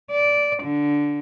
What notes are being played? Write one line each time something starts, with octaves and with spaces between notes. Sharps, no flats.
D5
D3